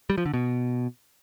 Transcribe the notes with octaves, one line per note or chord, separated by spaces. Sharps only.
G3
F3
D3
B2